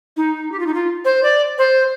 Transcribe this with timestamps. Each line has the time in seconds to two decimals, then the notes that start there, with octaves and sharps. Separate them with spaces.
0.17 D#4
0.52 G4
0.60 F4
0.67 D#4
0.74 F4
1.05 C5
1.23 D5
1.58 C5